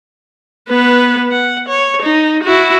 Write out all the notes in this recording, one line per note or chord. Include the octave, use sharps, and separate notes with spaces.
B3 B4
F#5
C#5
D#4
E4 F#4